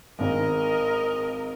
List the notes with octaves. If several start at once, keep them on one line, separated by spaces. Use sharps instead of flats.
G#1 G#2 A#4 D#5